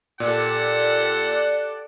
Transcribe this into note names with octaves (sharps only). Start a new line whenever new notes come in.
A#2 G4 A4 D5 F#5